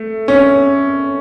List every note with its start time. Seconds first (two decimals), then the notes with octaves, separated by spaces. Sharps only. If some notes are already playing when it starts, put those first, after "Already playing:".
Already playing: A3
0.28 C#4